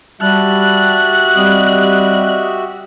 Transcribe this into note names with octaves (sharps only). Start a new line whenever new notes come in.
G3 F#4 G4 E5 A5 F#6
G3 C4 D#5